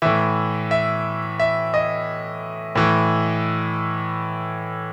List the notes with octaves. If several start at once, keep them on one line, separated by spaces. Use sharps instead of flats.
A2 E3 E5
E5
E5
D#5
A2 E3